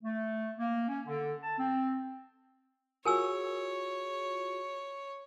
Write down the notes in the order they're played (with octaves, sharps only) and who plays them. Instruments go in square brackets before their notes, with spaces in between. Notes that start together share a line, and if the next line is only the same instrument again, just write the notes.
[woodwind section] A3
A#3
C#4
D3
A5
C4
[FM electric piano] F4 F#4 G#4 [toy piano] A#4 G#5 E6 [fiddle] C#5